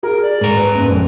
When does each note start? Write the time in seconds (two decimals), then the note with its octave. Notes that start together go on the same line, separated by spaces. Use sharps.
0.03 G#4 A#4 A#5
0.22 D5
0.41 G#2 A#4
0.56 B4
0.75 A#1 F#2
0.92 F2